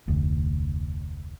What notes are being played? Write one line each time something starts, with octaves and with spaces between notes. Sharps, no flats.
F1 D2